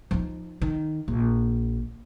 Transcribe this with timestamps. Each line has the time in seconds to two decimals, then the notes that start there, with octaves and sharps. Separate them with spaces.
0.11 F3 D#4
0.62 D#3
1.08 A#1